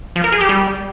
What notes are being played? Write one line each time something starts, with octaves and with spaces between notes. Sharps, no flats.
F3
A#4
G#4
G4
G3